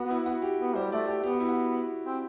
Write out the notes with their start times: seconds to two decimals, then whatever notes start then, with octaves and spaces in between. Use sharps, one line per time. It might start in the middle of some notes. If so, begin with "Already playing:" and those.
Already playing: B3 F#4
0.10 E4
0.26 F#4
0.42 G4
0.59 B3
0.75 G3 C5
0.92 A3 D5
1.07 A3 G4
1.23 B3 G4
1.32 F#4
1.40 E4
1.49 F#4
2.06 C4